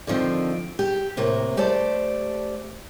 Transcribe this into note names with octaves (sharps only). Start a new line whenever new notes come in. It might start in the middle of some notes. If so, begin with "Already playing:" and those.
D3 D#3 F3 C4
G4
A2 C3 A#3
A3 G4 C5 D5 A5